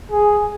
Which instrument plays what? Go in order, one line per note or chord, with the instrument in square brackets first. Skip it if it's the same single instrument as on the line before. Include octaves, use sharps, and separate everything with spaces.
[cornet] G#4